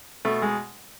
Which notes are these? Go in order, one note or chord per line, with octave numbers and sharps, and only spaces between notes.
B2 A3
G#3